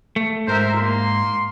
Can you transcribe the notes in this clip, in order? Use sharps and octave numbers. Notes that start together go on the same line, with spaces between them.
A3
G#2 A#4 C5 E5
A#3 C6